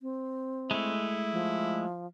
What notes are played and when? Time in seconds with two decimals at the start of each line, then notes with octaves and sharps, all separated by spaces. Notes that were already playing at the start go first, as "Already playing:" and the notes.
0.01 C4
0.71 G#3 A3 E4
1.32 F3